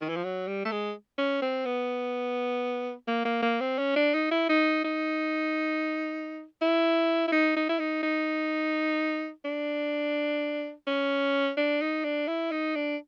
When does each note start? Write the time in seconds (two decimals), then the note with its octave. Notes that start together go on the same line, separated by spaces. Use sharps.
0.01 D#3
0.09 E3
0.16 F3
0.24 F#3
0.48 G3
0.65 A3
0.72 G#3
1.18 C#4
1.42 C4
1.65 B3
3.08 A#3
3.25 A#3
3.43 A#3
3.61 C4
3.78 C#4
3.96 D4
4.14 D#4
4.31 E4
4.49 D#4
4.84 D#4
6.61 E4
7.28 E4
7.32 D#4
7.56 D#4
7.69 E4
7.79 D#4
8.03 D#4
9.45 D4
10.87 C#4
11.57 D4
11.81 D#4
12.04 D4
12.28 E4
12.51 D#4
12.76 D4